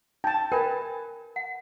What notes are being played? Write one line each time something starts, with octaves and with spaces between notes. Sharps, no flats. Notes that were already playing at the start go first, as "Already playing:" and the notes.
D#4 G5 A5
A#4 B4 G5 G#5
F#5